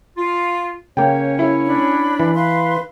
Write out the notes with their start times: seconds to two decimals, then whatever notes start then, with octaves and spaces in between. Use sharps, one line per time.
0.17 F4
0.97 C#3 A#3 C#4 C#5 G5
1.39 E4
1.67 D4 B5
2.20 E3
2.34 B4 F5 C6